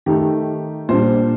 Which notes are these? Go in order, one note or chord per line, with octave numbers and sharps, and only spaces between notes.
D#3 A3 D#4 G4
A#2 G3 D4 C5